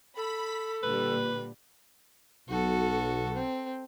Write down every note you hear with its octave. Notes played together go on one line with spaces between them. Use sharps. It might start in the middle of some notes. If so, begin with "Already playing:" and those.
A4 B5 B6
A#2 D3 G3 B4
B1 F#4 A4
C4